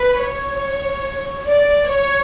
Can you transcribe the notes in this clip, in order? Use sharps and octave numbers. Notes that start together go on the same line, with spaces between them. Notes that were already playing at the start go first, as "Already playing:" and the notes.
Already playing: B4
C#5
D5
C#5